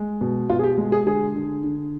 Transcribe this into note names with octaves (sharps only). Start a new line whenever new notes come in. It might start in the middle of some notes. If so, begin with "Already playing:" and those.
Already playing: G#3
B2
B2 F4
G#4
G4
G#3
G#4
D3 G#4
D3
D3